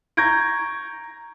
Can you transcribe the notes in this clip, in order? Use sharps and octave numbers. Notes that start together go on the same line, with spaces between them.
A#5 C#6 G6 G#6 A#6 D7